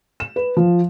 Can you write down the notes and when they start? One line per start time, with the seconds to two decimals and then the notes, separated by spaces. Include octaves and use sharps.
0.20 E7
0.36 B4
0.57 F3